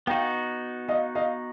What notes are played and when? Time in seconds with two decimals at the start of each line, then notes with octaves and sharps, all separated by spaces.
0.07 B3 D#4 F#4 F5 G5
0.89 D#5 F5
1.15 D#5 F5